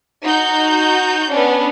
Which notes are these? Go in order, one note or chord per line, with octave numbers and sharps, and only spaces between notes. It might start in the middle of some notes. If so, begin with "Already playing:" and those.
D#4 F#4 G6
B3 C#4 D4